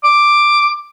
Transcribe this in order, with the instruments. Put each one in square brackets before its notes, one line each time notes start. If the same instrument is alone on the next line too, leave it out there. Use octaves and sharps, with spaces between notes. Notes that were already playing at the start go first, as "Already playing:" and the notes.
[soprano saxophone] D6